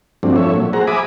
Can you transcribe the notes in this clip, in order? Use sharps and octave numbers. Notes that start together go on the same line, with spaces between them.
G2 F3 F#3 A3 C4 D4
F3 A3 C#5 E5
A#2 F#3
G#4 C5 F#5 A#5
E5 G#5 B5 D6 D#6